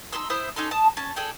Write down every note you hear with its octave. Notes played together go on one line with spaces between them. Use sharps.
D#4 G#4 C6 E6
E4 C5 E5 D#6
C#4 D#4 A4 C6
A5 D#6
C#4 A5
G#4 A4 D5 G5